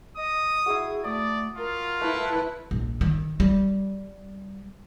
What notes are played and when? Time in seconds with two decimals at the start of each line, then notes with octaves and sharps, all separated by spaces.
0.17 D#5 D#6
0.66 E4 F#4 G#4
1.04 A3 D5 D#6
1.57 F4 A#4
2.01 A3 E4 B4
2.71 A#1
3.01 D#3
3.40 G3